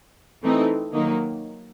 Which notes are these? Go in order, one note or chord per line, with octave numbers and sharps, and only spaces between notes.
E3 A3 C4 D#4
D#3 F#3 A#3 D#4